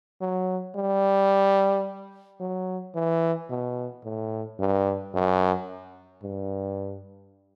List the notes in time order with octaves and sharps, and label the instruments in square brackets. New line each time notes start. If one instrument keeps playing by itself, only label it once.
[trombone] F#3
G3
F#3
E3
B2
A2
G2
F#2
G2